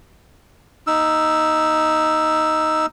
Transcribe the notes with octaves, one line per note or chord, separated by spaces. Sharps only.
D#4 E6